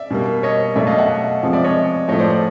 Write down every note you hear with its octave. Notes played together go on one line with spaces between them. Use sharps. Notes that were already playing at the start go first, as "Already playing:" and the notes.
Already playing: D5 E5
B2 G3 A#3
C#5 D#5
B2 F#3 A3 D5 E5
D#5 F5
E5 F#5
C3 F3 G#3
D5 E5
C#5 D#5
A2 F3 A3 C#5 D#5
C5 D5
C5 D5